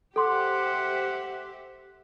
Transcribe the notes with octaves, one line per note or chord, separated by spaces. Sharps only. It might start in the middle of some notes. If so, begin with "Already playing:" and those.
G4 A4 C5 E5 F#5 C6 D6